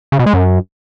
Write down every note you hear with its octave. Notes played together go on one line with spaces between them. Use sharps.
C#3
B2
G#3
F#2